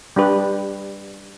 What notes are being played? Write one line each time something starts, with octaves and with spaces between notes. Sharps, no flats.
G3 D4 G4 B4